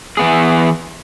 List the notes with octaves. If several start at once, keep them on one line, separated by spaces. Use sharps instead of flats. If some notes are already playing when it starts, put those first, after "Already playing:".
E3 B3 G#4